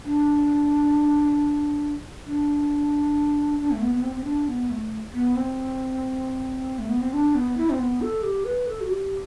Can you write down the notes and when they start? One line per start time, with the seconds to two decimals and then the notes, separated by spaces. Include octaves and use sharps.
0.05 D4
2.27 D4
3.59 D4
3.72 A3
3.82 B3
3.95 B3
4.03 C4
4.16 C4
4.25 D4
4.48 B3
4.70 A3
5.14 B3
5.36 C4
6.79 A3
6.90 B3
7.02 C4
7.13 D4
7.35 B3
7.57 E4
7.70 C4
7.79 B3
8.02 A4
8.23 G4
8.45 B4
8.68 A4
8.81 F#4
8.90 G4